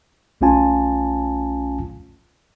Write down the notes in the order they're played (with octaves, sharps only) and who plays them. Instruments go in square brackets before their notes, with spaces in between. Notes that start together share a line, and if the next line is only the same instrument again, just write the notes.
[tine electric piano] B1 A3 C#4 F4 G#5 A5